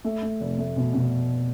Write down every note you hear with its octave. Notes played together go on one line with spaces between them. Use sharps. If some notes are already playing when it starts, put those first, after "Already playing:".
A3
A3
F1
A3
B2
B2